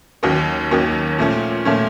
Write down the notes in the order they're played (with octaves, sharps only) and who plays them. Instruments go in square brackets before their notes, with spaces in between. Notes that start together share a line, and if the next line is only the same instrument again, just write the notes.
[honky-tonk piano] D#2 D#3 F#3 A#3 C#4
D#2 D#3 F#3 A#3 C#4
A#2 F3 A3 C#4
A#2 F3 A3 C#4